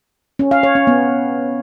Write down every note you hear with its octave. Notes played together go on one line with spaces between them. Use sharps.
C#4
F5
C#5
C#4
B3